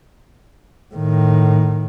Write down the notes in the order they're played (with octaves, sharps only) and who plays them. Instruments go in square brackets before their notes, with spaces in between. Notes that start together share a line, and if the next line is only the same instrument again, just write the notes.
[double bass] A2 D#3